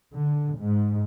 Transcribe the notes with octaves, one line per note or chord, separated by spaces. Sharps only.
D3
G#2